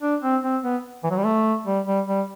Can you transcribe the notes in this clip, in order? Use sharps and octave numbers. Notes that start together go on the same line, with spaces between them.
D4
C4
C4
B3
E3
F#3
G3
A3
G3
G3
G3